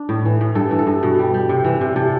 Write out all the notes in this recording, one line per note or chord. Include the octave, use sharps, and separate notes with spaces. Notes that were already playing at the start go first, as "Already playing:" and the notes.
Already playing: D4
A2
E3
A2
G2 A4
E3
A4
G2
B2
G3
G3
C3
E3
C3
C3 A4